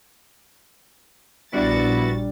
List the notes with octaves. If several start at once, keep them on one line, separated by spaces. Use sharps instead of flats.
A#1 G3 B3 D4 E4 F#4 A6